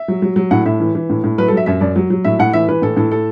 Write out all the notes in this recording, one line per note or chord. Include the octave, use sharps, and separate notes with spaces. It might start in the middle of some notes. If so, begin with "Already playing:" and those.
Already playing: E5
F#3
F#3
F#3
A2 F#5
A2 E5
E3
E3
A2
A2
F#3 B4
A4
F#3 E5
F#2 E5
F#2 D5
F#3
F#3
A2 E5
A2 F#5
E3 E5
E3 B4
A2 A4
A2 A4
A4